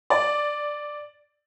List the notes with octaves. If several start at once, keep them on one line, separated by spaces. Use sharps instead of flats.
D5